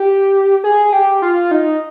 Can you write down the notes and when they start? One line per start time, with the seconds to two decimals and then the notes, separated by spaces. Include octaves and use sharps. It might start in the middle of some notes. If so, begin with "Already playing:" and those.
Already playing: G4
0.64 G#4
0.93 G4
1.22 F4
1.51 D#4